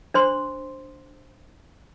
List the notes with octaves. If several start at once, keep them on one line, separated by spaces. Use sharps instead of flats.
D4 C5 C6